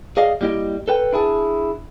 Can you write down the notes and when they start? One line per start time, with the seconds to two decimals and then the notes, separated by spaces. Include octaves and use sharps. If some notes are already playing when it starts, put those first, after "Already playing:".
0.17 G#4 D5 D#5 F5
0.41 G3 A#3 E4 G4 D#5
0.88 A4 B4 G5
1.13 D4 E4 G#4 A5